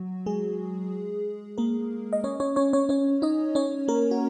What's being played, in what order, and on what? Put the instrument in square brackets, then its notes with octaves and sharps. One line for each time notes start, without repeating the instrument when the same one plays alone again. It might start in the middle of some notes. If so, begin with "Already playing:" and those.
Already playing: [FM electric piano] F#3 F#4
G#3 G#4
A#3 A#4
D#5
C#4 C#5
C#4 C#5
C#4 C#5
C#4 C#5
C#4 C#5
D#4 D#5
C#4 C#5
A#3 A#4
F#4